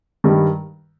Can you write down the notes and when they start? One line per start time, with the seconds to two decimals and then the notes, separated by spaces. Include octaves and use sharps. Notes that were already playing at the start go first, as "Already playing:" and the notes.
0.24 G2 D#3 G3